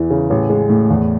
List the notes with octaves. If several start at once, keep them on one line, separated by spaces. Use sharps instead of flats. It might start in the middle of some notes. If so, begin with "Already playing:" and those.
Already playing: E2 E3
C#3
A1
G#3
A2
E2